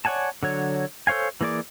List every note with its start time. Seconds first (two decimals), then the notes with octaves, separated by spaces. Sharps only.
0.05 C#5 D5 F#5 G#5 A5
0.43 D3 F#3 C#5
1.07 A4 C5 C#5 F5 G#5
1.41 E3 A#3 G#4 D5 D6